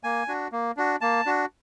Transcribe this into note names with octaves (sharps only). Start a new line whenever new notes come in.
A#3 G#5
D4 F#4
A#3
D4 F#4
A#3 A5
D4 F#4